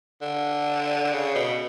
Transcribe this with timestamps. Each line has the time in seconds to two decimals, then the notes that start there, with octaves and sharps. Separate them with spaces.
0.21 D3
1.04 D3
1.12 C#3
1.35 B2